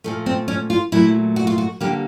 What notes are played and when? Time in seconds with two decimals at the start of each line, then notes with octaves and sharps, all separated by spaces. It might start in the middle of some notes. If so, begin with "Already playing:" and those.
0.04 A#2 F3 A3
0.26 C4
0.48 C#4
0.70 F4
0.92 A#2 F#3 A3 E4
1.36 F#4
1.47 F4
1.58 F#4
1.81 D3 G3 A#3 G4